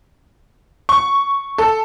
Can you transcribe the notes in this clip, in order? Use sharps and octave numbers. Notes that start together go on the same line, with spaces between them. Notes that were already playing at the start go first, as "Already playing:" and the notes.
C#6
A4